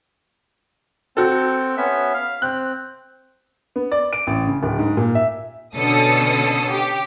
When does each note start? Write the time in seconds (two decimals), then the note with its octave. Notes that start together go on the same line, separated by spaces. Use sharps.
1.17 C4 F#4 A4
1.77 B3 C#4 E5
2.14 F5
2.42 C4 F#6
3.76 B3
3.92 D5
4.13 D7
4.27 A1
4.47 C#3
4.63 D1
4.79 G#2
4.97 A#2
5.15 E5
5.76 B2 D3 C#4 A4 D#6 C#7
6.72 G4